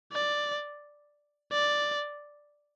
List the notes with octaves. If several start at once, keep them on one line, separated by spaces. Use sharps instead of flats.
D5
D5